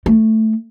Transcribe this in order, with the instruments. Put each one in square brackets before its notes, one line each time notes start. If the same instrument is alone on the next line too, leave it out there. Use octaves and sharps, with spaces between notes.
[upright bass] A3